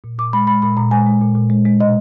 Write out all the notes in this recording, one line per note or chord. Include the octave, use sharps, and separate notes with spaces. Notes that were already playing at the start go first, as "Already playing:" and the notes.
A#2
A#2 D6
G#3 B5
G#3 B5
A#2 B5
A#2 A#5
G#3 G#5
G#3
A#2
A#2
G#3
G#3
B2 D#5